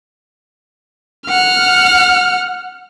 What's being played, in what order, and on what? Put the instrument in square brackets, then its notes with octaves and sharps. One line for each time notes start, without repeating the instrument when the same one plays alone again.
[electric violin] F#5 F6